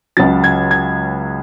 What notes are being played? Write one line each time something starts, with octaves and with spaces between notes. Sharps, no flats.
C#2 C#3 F#3 A6
G#6
G#6